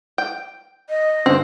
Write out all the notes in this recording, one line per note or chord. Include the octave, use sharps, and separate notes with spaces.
G5
D#5
G1 C4